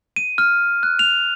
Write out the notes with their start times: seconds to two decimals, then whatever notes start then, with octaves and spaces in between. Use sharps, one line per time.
0.16 D#7
0.38 F6
0.83 F#6
0.99 F7